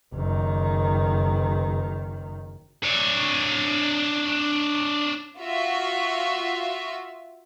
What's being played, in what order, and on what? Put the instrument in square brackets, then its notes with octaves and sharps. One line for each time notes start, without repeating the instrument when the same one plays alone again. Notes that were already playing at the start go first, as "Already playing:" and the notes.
[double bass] F#1 D#3
[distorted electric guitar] D4 C#5
[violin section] F4 F#4 E5